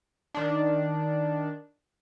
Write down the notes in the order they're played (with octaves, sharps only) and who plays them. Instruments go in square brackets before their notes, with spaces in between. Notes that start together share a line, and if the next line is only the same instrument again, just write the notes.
[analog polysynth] D#3 D4